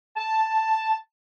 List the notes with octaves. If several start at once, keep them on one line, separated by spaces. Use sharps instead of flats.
A5